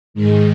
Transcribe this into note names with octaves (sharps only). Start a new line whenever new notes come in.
G#2 D#3 G#3